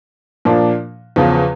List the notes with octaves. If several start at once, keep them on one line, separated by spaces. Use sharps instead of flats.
A#2 F3 A#3 D4
E2 C#3 F3